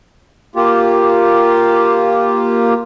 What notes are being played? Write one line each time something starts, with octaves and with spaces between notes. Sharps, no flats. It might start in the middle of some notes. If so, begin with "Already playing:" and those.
A#3 F4 G4